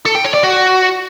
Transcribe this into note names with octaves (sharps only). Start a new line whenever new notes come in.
A4
G5
C#5
D5
F#4